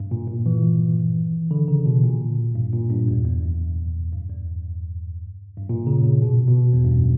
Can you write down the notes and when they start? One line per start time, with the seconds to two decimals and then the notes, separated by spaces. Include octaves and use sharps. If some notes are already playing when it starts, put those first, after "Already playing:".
Already playing: G2
0.11 A#2
0.28 A#2
0.46 E3
1.51 D3
1.68 C#3
1.86 B2
2.03 A#2
2.55 G2
2.73 A#2
2.90 G2
3.08 E2
3.25 E2
3.43 F#2
4.12 G2
4.30 E2
5.58 G2
5.69 A#2
5.87 C#3
6.04 C#3
6.22 B2
6.48 B2
6.73 E2
6.85 G2
6.91 F#2